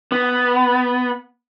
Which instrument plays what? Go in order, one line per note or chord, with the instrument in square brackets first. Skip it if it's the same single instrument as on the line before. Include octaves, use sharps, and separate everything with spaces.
[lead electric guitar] B3